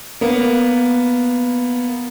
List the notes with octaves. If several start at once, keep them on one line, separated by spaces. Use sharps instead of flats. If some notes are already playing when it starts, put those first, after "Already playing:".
A#3 B3